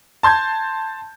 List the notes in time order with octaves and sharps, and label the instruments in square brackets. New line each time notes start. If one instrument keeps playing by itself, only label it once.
[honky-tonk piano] A5 C6 G6 G#6